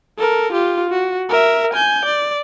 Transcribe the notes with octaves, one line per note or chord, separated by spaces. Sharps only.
A4 A#4
F4 G4
F#4
A#4 E5
G#5 G6
D5